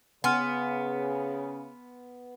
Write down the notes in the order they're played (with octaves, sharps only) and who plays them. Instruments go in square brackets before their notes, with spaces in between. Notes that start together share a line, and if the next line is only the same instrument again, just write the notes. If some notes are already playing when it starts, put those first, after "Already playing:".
[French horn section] C#3 [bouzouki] B3 [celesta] G#5 C6 F6